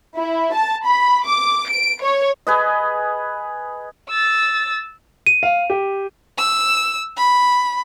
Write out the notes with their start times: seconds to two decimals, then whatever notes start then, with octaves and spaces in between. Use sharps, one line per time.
0.17 E4
0.54 A5
0.86 B5
1.25 D6
1.69 D7
2.03 C#5
2.47 G#4 B4 D#5
4.10 E6 A6
5.27 D#7
5.43 F5
5.70 G4
6.38 E6
7.17 B5